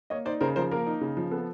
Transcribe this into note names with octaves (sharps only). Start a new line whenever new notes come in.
A#3 C#5 D#5
D#4 C5 D5
C#3 A#4 C5
F3 A#4 C5
A#3 A#4
D#4
C#3
F3
B3 A4